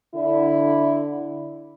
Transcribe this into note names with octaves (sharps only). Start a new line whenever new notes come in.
D3 E4